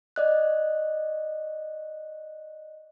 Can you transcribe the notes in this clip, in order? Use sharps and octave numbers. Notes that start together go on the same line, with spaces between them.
D5 D#5 F#6